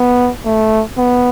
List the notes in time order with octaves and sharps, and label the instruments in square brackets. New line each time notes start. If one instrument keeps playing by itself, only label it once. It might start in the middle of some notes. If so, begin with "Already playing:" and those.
Already playing: [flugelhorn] B3
A3
B3